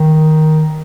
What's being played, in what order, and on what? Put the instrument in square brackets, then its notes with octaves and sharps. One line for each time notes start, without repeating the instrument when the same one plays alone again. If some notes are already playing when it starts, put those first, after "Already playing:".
Already playing: [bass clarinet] D#3